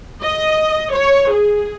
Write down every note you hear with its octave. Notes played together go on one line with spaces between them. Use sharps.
D#5
C#5
G#4